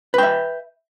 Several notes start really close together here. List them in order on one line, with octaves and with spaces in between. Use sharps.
B4 G5 E5